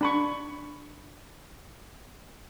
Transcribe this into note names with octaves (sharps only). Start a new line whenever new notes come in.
D4 B5 C#6